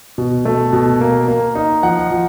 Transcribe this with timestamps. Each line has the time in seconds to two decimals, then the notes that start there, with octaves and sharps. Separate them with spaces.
0.18 B2
0.45 A3
0.73 B2
1.01 A#3
1.28 A#3
1.55 D#4
1.83 F3 F#5
2.11 F3